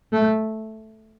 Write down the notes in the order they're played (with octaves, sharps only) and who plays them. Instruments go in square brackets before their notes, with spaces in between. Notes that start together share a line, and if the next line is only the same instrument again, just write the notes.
[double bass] A3